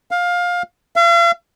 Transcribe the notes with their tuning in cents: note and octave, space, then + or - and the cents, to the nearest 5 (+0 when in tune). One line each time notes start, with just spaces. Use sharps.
F5 +20
F5 -40